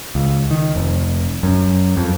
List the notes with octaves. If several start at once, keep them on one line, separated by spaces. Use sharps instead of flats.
C#2
D#3
F1
F#2
F2